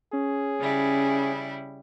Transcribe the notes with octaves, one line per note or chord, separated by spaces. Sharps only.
C#4 G#4
C#3 G3 E4